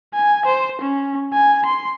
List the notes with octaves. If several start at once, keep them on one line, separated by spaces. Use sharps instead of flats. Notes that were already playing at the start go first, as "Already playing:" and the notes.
G#5
C5
C#4
G#5
C6